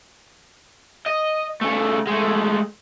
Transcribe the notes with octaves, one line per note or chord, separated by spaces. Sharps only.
D#5
C#3 A3
G#3 A3